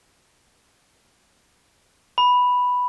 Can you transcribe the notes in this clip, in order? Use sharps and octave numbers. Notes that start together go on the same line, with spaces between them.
B5